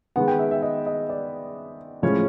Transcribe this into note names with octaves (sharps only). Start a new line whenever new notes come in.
D#3 G#3 B3 F#5
G5
E5
E5
D#5
D#5
D5
A2 F3 G#3 C#4 C#5